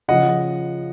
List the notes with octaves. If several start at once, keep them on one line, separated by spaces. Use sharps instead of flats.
C#3 F3 D#5 F#5